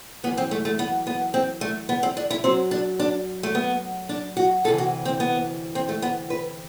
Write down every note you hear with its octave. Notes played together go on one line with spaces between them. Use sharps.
F#2 E3 B3
C4
A3
A3
B3
B3
C4
A3
B3
C4
D4
E4
F#2 F#3 C4
D4
D4
A3
B3
D4
F#4
D2 C3 E3 A4
F#4
C4
B3
C4
A3
B3
B4